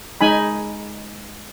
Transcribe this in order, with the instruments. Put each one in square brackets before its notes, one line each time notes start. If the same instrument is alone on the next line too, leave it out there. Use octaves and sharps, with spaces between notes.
[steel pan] G#3 D#4 G#5 B5